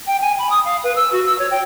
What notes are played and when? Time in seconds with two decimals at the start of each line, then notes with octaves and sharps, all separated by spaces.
0.07 G5
0.21 G#5
0.38 B5
0.50 D#6
0.64 F5
0.83 B4
0.96 E6
1.12 F#4
1.25 E6
1.38 C#5
1.51 G5